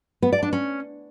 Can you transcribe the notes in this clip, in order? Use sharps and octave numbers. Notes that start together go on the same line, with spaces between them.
B3
D5
D4
C#4